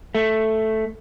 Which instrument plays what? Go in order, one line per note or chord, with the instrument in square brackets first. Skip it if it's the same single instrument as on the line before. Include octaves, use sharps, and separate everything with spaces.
[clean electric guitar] A3